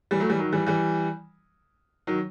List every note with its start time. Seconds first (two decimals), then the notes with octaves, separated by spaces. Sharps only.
0.11 E3 G3
0.20 F#3 A3
0.29 E3 G3
0.39 D#3 F#3
0.52 E3 G3
0.66 E3 G3
2.07 D#3 F#3